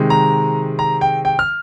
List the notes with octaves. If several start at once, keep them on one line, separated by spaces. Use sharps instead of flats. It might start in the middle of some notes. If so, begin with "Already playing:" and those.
Already playing: C3 D#3 G#3
A#5
A#5
G5
G5
F6